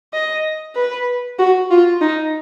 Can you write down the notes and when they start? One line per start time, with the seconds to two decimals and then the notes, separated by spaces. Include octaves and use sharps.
0.13 D#5
0.76 B4
1.39 F#4
1.71 F4
2.01 D#4